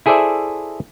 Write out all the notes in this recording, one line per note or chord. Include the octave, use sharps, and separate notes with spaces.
E4 G#4 A4 C5 D5 E5